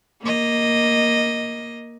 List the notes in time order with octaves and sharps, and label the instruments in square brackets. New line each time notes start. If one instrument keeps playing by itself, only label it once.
[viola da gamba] A#3 D#5